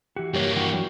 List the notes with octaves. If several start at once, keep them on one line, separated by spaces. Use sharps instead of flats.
E3 F#4 G4
G2 A#3 G4 C#5
E3 D4 E4 F#4 G5 C#6
F#3